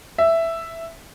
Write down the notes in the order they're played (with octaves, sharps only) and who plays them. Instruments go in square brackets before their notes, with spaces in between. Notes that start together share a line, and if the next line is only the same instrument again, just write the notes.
[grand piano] E5